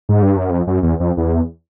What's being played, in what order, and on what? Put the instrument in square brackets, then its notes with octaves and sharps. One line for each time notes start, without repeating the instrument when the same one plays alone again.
[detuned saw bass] G#2
G2
F#2
F2
F#2
E2
F2
E2